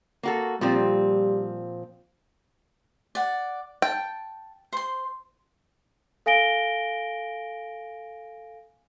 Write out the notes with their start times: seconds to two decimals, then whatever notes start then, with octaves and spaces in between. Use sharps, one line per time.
0.23 A#3 F#4 A4
0.61 A#2 F3 G3 C4
3.15 D5 F#5
3.82 G5 A5
4.72 C5 C6
6.26 A4 F5 G#5 A#6 D7 G7